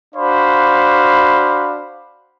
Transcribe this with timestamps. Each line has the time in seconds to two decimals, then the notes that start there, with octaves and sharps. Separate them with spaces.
0.15 D4 F#4 C5 F5 B5